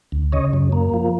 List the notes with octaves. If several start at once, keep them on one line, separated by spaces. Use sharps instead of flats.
D2
C#3 C#5 D#5
F#2
A#3
F3